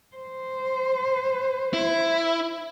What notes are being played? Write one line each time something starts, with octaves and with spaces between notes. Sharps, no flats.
C5
E4